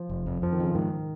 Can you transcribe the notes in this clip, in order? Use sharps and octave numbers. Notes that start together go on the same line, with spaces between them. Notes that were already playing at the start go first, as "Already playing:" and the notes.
Already playing: F3
F1
F2
F2 F3
D#3
C#3 F3
G#2 D#3